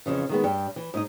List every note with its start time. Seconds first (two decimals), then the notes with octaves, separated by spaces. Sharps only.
0.06 F2 A2 C#3 E3
0.29 D#3 G#3 B3
0.44 G2 G4
0.76 E3
0.94 G#2 D#4 D#5